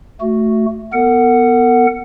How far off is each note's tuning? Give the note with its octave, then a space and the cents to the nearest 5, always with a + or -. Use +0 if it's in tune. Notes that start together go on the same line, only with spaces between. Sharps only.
A3 +5 F#4 +0
B3 +0 A#4 -40 F#5 +0